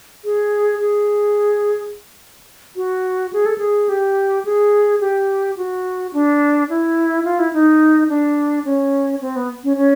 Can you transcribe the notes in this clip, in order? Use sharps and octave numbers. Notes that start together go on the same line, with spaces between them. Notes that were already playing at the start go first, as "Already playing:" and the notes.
G#4
G#4
F#4
G#4
A4
G#4
G4
G#4
G4
F#4
D4
E4
F4
E4
D#4
D4
C#4
C4
B3
C#4
C#4